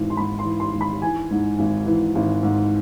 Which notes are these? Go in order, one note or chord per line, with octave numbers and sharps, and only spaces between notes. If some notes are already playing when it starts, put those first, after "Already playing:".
Already playing: G#1 E3
C6
G#2 B5
C6
E3
C6
G#1
B5
E3 G#5
G#2
G#1
E3
G#1
G#2